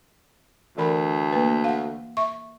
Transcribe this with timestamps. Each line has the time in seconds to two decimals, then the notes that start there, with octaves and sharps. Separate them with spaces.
0.78 D2 E3 A#4 B5
1.33 A#3 B4
1.64 F5 F#5
2.17 E5 C#6